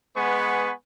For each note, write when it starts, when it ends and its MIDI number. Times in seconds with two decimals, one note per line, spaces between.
0.17 0.72 56
0.17 0.72 59
0.17 0.72 71
0.17 0.72 78
0.17 0.72 80
0.17 0.72 85